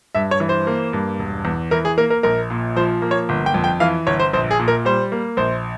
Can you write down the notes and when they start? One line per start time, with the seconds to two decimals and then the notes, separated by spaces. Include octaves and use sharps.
0.15 G2 E5
0.31 C#5
0.40 E3
0.49 C5
0.67 A#3
0.93 G2
1.19 E1
1.45 E2
1.71 E3 A#4
1.85 G#4
1.98 A#3 A#4
2.10 A#4
2.23 A#1 A#4
2.50 A#2
2.76 F3 C5
3.02 A#3
3.11 C#5
3.29 G1
3.46 G5
3.54 F2
3.64 G5
3.80 E3 F5
4.07 G1 C#5
4.20 C5
4.33 A#1 C5
4.51 G#4
4.60 A#2
4.68 A#4
4.85 G3 C5
5.12 A#3
5.37 A#1 C5